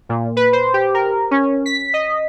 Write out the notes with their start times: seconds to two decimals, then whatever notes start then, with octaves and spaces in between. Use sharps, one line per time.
0.09 A#2
0.36 B4
0.53 C5
0.74 G4
0.94 A#4
1.31 C#4
1.66 B6
1.94 D#5